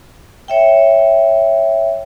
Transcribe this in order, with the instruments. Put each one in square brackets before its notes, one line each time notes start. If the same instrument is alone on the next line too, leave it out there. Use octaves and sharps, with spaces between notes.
[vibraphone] C#5 E5 G5